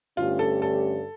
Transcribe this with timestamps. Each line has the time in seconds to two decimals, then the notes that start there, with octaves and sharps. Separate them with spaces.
0.17 G2 D3 A3 C#4 F4 G4
0.39 A4
0.62 A4